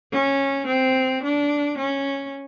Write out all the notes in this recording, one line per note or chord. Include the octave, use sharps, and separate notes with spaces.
C#4
C4
D4
C#4